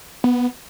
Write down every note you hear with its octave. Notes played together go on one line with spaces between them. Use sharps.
B3